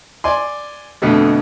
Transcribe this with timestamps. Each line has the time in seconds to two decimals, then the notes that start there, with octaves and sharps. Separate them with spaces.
0.24 D5 G#5 C6
1.02 F2 B2 D3 A3